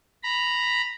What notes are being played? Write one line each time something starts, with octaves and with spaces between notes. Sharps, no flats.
A#5 B5